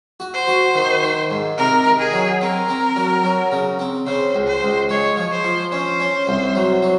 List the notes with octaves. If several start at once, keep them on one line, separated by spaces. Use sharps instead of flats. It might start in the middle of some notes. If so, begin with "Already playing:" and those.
F#4
C5
F#4
D#3
D#3
G#2
C3 A#4
D#3
G#4
F#3
C4 A#4
C4
F#3
F#3
C#3
C4
C#3 C5
C#2
C5
C#2
G#3 C#5
F3
C5
F3
C#4 C5
C#4
C2
F#3
F#3